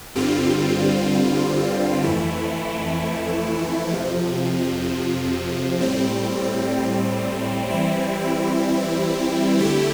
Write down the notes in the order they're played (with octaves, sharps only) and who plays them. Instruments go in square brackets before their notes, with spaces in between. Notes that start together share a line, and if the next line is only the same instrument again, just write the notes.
[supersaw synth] G2 D3 G3 C4 F4
F2 E3 A3 E4
F2 C3 F3
A2 G3 C4
E3 G3 C4 E4
D3 A3 E4 G4